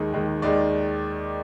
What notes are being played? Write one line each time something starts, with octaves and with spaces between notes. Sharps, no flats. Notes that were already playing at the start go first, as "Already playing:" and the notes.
Already playing: D#2 D#3 G#3
D#2 D#3 G#3
D#2 D#3 G#3 D5